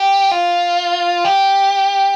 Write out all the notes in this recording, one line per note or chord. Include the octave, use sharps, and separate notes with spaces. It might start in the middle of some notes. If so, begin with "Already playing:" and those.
Already playing: G4
F4
G4